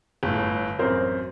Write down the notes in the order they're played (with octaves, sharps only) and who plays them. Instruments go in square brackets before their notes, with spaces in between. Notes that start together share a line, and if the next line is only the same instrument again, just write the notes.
[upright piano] G1 A2
A1 F#2 C4 A#4 C5